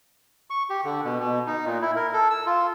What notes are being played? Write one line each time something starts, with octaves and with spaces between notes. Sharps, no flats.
C#6
G4
D3
B2
B2
D#4
A#2
E4
A#4
A4
E6
F4